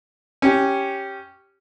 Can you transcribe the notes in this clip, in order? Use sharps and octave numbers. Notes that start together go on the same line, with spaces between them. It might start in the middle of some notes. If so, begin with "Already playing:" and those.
C#4 G4